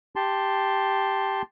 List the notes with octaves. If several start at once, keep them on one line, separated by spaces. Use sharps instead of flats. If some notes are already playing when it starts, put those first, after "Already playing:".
G4 A5 C6